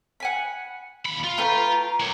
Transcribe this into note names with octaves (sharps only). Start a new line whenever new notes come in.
F#5 G#5 B5
D#2 B5
F4
A3 B4 G5 A#5
A#3 C#5